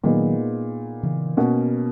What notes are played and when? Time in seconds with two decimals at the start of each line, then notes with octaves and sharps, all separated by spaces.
0.04 A#2 D#3 F#3 G#3 B3 D#4
1.03 C#3 E3
1.37 B2 A#3 C#4 F#4